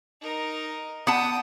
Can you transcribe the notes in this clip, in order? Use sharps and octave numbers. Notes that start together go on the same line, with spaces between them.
D#4 A#4
B3 F#5 G5 A5 D#6